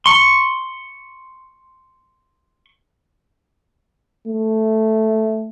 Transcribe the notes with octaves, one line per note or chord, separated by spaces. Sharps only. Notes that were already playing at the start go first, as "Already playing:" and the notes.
C6 C#6
A3